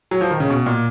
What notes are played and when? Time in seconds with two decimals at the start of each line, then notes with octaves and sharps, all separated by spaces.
0.11 F#3
0.21 F3
0.31 D#3
0.40 C#3
0.50 B2
0.66 A#2